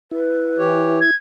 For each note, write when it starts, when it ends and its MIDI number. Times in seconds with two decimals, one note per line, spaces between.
0.11 1.11 64
0.11 0.93 71
0.58 0.99 52
0.58 0.99 67
0.58 0.99 73
1.01 1.15 92